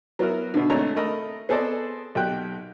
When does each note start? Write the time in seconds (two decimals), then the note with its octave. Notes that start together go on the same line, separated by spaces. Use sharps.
0.19 F#3 B3 E4 F#4 A#4
0.54 B2 D3
0.70 G#1 A3 D4 C#5 A#5
0.96 A3 A#4 D#5 B5
1.49 B3 G#4 A4 C5 D5 D#5
2.15 B1 G4 G5 F#6